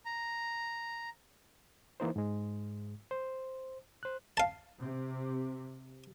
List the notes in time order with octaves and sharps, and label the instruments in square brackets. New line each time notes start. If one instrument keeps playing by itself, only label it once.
[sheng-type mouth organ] A#5
[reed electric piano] E3 A#3 D#4 C5
G#2 G#3
C5
C5 F#6
[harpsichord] F5 A5
[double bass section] C3